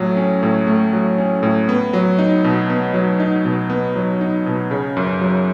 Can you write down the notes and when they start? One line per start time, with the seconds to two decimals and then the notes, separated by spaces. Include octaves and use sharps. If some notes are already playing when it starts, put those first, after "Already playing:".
Already playing: A2 F#3 A3
0.16 C#4
0.43 A2
0.67 A3
0.93 F#3
1.18 C#4
1.43 A2
1.69 B3
1.93 F#3
2.19 D#4
2.44 B2
2.70 B3
2.94 F#3
3.20 D#4
3.45 B2
3.70 B3
3.95 F#3
4.21 D#4
4.46 B2
4.71 C#3
4.97 F#2
5.21 F#3